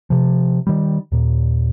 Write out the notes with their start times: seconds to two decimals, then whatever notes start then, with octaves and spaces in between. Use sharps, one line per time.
0.10 C3 F3
0.67 D#3 G3
1.12 D#2 A#2